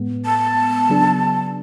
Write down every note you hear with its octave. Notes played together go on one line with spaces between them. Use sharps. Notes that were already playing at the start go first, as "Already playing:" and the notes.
Already playing: A2 G#3 B3
A5
C#3 F#3 B3 D4 G#4